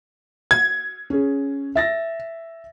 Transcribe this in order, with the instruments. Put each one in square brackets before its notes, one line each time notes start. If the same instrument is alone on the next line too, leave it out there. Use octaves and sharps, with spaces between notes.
[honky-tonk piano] G#6
[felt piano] C#4 G#4
E5 A6 A#6